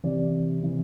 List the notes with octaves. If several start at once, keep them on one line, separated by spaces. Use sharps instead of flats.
C3 E3 D5
C3 E3